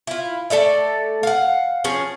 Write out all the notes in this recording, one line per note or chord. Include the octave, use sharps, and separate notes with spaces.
E4 F4
A3 A4 D5 E5
F5 F#5
F3 C#4 G#4